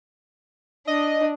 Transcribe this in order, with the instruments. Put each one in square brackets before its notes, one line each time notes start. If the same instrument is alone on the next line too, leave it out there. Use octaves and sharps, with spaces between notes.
[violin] D4 [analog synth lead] D#5